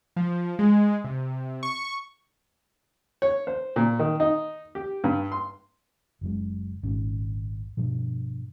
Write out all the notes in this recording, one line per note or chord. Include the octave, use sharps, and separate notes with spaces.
F3
G#3
C3
C#6
C#5
C5
A#2
D#3
D#4
G4
G2
C6
F#1 F#2 G#3
D#1 G#1 C#4
G2 B2 F3